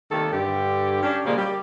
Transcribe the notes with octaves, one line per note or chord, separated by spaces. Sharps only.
C3 D#3 G3 A3 A#3 A4
G2 D3 G4
C#4 D4 G4
A#2 C#3 F3 G3 G#3 A#3
G3 G4